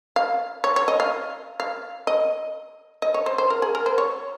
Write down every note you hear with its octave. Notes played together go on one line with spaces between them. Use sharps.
F5
C#5
C#5
D#5
F5
F5
D#5
D#5
C#5
C5
C5
A#4
G#4
A#4
C5
C#5